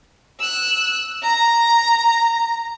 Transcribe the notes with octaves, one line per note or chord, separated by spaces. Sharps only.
E6 F#6
A#5